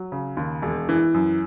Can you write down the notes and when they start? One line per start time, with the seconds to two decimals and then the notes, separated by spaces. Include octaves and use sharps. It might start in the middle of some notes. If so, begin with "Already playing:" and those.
Already playing: F#3
0.12 C#3
0.37 D#2
0.62 E1
0.89 E3
1.14 F#2